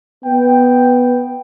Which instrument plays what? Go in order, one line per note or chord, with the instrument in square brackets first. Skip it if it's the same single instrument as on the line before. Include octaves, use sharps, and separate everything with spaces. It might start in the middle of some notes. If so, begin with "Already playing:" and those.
[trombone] B3 [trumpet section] G5